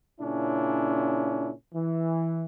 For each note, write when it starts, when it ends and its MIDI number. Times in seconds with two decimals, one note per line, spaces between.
0.21 1.51 46
0.21 1.51 49
0.21 1.51 61
0.21 1.51 62
0.21 1.51 64
1.74 2.46 52